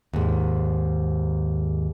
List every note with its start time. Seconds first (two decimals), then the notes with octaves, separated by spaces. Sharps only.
0.14 D#2 G#2